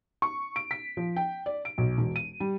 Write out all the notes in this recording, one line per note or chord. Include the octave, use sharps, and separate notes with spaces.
C#6
D7
B6
F3
G5
D5
D7
B1
E1
D#7
G3